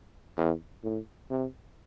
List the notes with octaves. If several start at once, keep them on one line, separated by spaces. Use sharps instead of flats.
E2
A2
C3